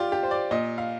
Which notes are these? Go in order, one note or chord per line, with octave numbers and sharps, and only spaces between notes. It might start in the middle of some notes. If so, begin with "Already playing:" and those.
Already playing: F4 G4 D5
G4
C5
D5
A#2 D#5
F5